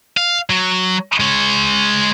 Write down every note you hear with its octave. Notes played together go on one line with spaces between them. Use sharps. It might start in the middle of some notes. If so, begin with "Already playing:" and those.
F5
F#3
G#3 C#5